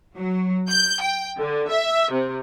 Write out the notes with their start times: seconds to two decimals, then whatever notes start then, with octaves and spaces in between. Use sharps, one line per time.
0.16 F#3
0.69 G6
1.01 G5
1.38 D3
1.70 E5
2.11 C3